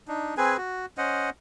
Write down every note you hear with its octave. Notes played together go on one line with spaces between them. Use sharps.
D4 D#4
C4 G#4 B4 G#5
F#4
C#4 C5 D#5 F#5